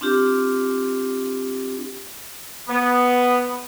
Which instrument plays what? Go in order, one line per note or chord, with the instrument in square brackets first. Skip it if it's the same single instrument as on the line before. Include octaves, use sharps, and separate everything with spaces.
[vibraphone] C4 D4 F4 G4
[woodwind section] B3